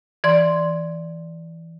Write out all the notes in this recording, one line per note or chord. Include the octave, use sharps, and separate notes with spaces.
E3 D5 C6